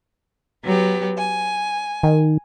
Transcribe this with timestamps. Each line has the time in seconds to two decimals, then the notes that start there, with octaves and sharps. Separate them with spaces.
0.64 F#3 B3 G4
1.19 G#5
2.03 D#3